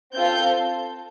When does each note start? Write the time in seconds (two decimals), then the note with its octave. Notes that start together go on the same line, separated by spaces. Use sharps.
0.13 C4 F4 A4 G6